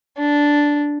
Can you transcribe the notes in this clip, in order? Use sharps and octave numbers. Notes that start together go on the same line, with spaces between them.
D4